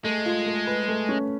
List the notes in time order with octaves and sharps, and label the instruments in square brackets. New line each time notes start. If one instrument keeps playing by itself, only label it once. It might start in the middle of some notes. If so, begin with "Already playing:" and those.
[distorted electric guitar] G#3 [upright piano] A3
[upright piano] F4
A3
B4
A3
C#4